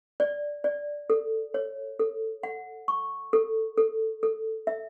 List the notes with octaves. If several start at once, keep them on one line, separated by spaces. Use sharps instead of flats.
D5
D5
A4
C#5
A4
F#5
C#6
A4
A4
A4
E5